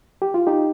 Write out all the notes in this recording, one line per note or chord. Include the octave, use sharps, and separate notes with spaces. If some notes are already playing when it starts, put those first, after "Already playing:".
G4
F4
D#4 G4